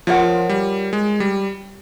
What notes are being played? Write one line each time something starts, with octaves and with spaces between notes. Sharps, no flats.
F3 F4 A#4 C#5 F#5
G3
G#3
G3